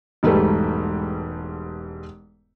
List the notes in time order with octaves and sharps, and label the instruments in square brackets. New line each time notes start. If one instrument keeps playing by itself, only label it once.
[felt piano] E1 G#2 G3 A3 G4 B4